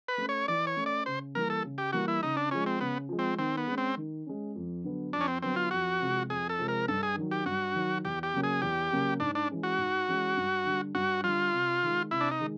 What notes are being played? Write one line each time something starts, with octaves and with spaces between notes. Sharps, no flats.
B4
A3 C#4
C#5
E3 D5
C#5
A3 C#4
D5
C#3 C5
E3 G3 A#3 A#4
A4
C#3
G4
E3 G3 A#3 F#4
E4
C#3 D#4
D4
F3 G#3 C#4
C4
C#3 B3
F3 G#3
C4
D#3 C4
B3
G#3 C#4
C4
D#3
G#3 C#4
F2
D3 F#3 B3
F2 D4
C#4
C4
D3 F#3 B3 C4
F4
F2 F#4
C3 F3 G#3 C4
F2 G#4
A4
C3 F3 G#3 C4
A#4
G2 A4
G#4
D#3 F#3
G4
G2 F#4
D#3 F#3
E2 G4
G4
C#3 F#3 A#3 C#4
G#4
E2 G4
C#3 F#3 A#3 C#4
G#2 D4
D4
E3 G#3 C#4
F#4
G#2
E3 G#3 C#4
G2
D3 G3
G2 F#4
D3 G3 F4
C3
D#3 G#3
C3 E4
D4
D#4
D#3 G#3